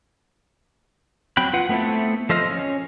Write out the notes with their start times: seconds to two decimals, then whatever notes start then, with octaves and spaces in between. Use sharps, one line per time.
1.37 F#3 C4 G5 B5 F#6
1.53 F4 B4 F#5
1.69 A3 B3 C4 E4 A4
2.29 F3 A4 C5 D#5 F6
2.50 C#4